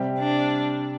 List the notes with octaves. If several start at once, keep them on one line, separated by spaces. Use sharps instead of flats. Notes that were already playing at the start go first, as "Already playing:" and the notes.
Already playing: C3 G3 C4 G4
D4